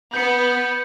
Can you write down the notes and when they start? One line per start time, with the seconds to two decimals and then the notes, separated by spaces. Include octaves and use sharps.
0.14 B3 G6 C#7